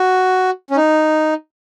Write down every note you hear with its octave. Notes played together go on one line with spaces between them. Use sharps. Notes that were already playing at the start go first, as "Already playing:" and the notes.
Already playing: F#4
C#4
D#4